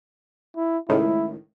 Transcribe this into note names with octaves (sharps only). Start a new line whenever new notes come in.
E4
C#2 A2 D#3 E4